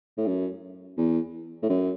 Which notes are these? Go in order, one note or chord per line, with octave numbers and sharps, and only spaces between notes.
A2
F#2
E2
A2
F#2